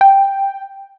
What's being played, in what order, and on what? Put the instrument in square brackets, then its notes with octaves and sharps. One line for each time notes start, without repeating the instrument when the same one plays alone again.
[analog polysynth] G5